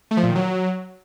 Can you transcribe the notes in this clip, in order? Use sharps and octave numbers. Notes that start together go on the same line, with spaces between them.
A3
F3
A#2
D#3
F#3